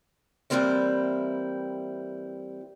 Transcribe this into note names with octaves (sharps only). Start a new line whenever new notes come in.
E3 F#3 G3 A#3 C4 E4